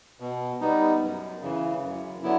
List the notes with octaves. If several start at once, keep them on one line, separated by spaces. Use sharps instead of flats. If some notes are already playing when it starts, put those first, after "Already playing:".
B2
G3 B3 D#4
F#2
C#3 E3
F#2
D3 F#3 B3 E4